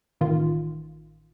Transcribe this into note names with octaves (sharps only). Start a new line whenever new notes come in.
A1 D#3 F4